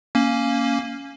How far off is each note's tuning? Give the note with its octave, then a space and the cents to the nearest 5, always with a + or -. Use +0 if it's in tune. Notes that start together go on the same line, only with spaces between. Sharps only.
A#3 +0 C#4 +0